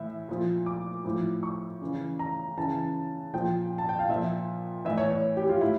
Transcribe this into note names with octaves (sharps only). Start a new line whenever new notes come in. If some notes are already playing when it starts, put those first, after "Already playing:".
Already playing: A2 E3 E5
A#2 F3
D6
A2 F3
C#6
C#3 E3
A#5
C#3 E3 A5
A#2 F3 G5
A5
G5
F5
A#2 F3 E5
A2 E3 E5
C#5
C#5
G4
F4
A2 E4